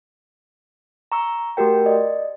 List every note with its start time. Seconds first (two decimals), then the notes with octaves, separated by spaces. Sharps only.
1.12 A#5 C#6 E6
1.57 A3 F#4 G4 A#4 G5
1.86 D5 D#5